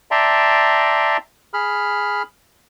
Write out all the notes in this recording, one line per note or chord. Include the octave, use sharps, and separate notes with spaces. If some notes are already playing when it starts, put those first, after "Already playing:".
D5 E5 G5 A5 A#5 C6
G#4 B5 F6